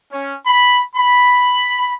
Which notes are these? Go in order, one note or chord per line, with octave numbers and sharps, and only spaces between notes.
C#4
B5
B5